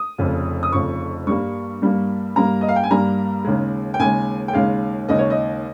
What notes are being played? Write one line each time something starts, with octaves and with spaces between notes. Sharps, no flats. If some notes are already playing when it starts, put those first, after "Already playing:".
Already playing: D#6
F1 F2 C#3
D#6
F1 F2 C#3 C#6
G2 G3 A#3 C#6
G2 G3 A#3
G2 G3 A#3 A#5
D#5
F5
G5
G#5
G2 G3 A#3 A#5
D#2 C#3 G#3
G5
D#2 C#3 G#3 G#5
G5
D#2 C#3 G#3 F5
D#2 C#3 G#3 D#5
C#5
D#5